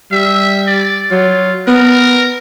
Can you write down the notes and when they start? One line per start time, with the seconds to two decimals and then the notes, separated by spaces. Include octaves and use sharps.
0.12 G3 E5
0.67 D5
1.11 F#3 F4
1.67 B3 A#4